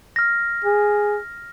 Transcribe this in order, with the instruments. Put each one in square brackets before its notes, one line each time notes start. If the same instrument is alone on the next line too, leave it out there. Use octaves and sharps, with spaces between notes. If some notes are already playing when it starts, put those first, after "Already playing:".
[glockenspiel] F6 A#6
[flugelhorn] G#4